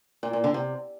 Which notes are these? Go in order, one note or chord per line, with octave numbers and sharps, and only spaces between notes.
A#2
A#2
D3
C3